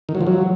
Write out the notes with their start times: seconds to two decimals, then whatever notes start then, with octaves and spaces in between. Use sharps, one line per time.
0.09 D#3
0.15 F#3
0.21 F3
0.27 F#3